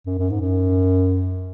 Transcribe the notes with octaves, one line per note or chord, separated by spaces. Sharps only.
F#2
F#2
G#2
F#2